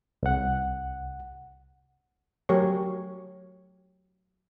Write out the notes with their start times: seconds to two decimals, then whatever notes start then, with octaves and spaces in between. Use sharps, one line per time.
0.23 C2 F#5
2.49 F#3 A3 G4 A#4 C#5